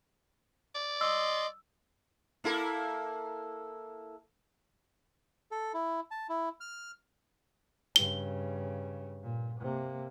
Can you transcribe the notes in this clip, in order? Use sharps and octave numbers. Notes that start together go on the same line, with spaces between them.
D5
D#5 C6 D#6 E6
A#3 E4 A4
A4
E4
A5
E4
F6
G2 C#3 G7
A#2
C3 A#3